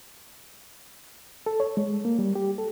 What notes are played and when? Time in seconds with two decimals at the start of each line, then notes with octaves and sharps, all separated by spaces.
1.46 A4
1.60 C#5
1.77 G#3
2.05 A#3
2.19 G3
2.35 G4
2.58 A4